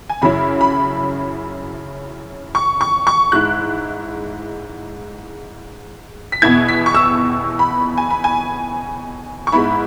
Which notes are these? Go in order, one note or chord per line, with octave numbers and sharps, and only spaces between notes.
G#5
F#2 C#3 F#3 C#4 E4 B5
B5
C#6
C#6
C#6
G#2 G#3 E4 F#6
B6
E2 B2 B3 E4 G#6
B6
C#6
E6
B5
G#5
B5
G#5
C#6
G#2 G#3 B3 E4 B5